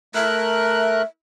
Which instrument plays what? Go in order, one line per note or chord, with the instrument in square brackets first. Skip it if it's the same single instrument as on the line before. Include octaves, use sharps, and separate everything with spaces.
[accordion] A3 A#4 F#6 [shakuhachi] E5